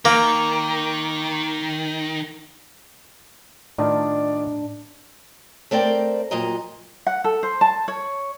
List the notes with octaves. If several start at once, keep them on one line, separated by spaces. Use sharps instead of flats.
D#3 A#3
A2 D#3 A3 D4 F4 D5
A3 C4 A#4 D5 G5
F2 A#2 F#3 D#5 A#5
F#5
A4
C5
A5
C#5